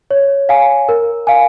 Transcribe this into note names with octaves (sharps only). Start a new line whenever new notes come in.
C#5
F5 G#5
A#4
F5 G#5